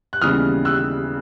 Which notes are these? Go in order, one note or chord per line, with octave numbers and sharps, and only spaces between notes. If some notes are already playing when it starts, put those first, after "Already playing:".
F#6
D#2 C#3 E3 G3 B3 D#6 F6
E6 F#6